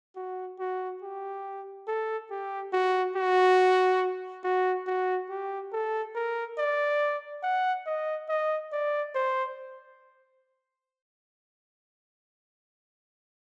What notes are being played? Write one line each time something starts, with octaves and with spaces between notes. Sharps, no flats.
F#4
F#4
G4
A4
G4
F#4
F#4
F#4
F#4
G4
A4
A#4
D5
F#5
D#5
D#5
D5
C5